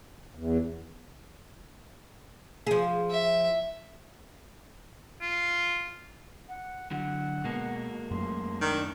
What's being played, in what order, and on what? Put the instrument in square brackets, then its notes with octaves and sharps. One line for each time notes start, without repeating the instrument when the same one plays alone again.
[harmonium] E2
[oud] F3 G#4
[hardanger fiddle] E5
[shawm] F4
[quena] F#5
[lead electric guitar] D3 F#3 [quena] F#5
[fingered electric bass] B2 [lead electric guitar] G#3 A#3
[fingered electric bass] F#2 F#3 A3 [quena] C6
[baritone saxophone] D#3 [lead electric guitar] D4 [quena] C#6